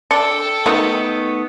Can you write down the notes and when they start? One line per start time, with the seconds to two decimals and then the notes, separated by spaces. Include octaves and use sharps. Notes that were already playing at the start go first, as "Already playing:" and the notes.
0.11 D4 A4 G5 C#7
0.66 D#3 F#3 A3 B3 D#4 F#4